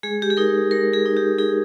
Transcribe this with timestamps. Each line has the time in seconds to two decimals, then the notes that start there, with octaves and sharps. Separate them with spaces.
0.03 G#3 G#4
0.22 G4
0.30 G#4
0.37 D#4 A#4
0.71 G#3 A#4
0.93 G#4
1.06 D#4
1.17 G4
1.39 D#4 G#4